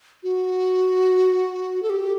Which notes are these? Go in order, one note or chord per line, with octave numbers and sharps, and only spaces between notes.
F#4
A4
G4